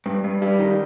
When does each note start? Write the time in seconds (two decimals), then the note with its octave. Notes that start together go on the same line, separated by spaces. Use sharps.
0.06 G2
0.24 G2
0.42 G3
0.59 D#3